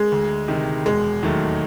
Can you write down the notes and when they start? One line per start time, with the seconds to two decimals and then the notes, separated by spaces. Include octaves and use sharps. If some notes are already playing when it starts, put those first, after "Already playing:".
Already playing: G#3
0.12 D2
0.48 C3 D#3
0.86 E1 G#3
1.23 D#2 D#3 F#3 A3